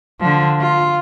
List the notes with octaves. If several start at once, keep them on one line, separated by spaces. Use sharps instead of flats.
D3 F3
F4